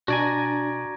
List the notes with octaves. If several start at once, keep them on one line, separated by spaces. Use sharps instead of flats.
B2 D4 F#4 D5 G#5 A#5 G#6 A#6